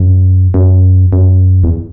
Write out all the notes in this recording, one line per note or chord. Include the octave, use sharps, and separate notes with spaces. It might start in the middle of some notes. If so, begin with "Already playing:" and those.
Already playing: F#2
F#2
F#2
E2